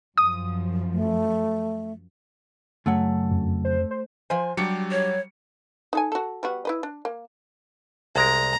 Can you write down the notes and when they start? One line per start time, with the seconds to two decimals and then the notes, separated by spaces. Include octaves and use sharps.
0.18 F#2 F3 D#6
0.93 A3
2.86 F#2 C#3 F#3 A3 F#5
3.31 F2
3.65 C5
3.91 C5
4.30 F3 C5 G#5
4.57 F#3 G3 D4 G4 C#7
4.91 C#5
5.93 D#4 A4 G#5
6.12 F#4 A4
6.43 G3 B3 F#4
6.65 E4 B4 D#5
6.83 D4
7.05 A#3
8.16 C2 G#3 A#4 A#5